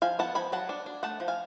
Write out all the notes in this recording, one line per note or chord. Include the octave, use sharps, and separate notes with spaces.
F3 F5 G#5
B3 F#5 A5
F3 G#5 B5
F#3 F#5 A5
D4
D4
A3 F#5 A5
F3
F5 G#5